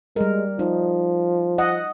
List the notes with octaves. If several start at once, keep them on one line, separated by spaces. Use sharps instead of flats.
G3 G#3 A#4
F3 D#4
D#5 F#5